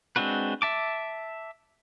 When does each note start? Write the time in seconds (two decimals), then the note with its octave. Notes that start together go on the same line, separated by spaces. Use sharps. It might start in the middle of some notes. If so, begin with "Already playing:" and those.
0.16 G#3 C4 D4 F#4 B4
0.62 E5 A5 D6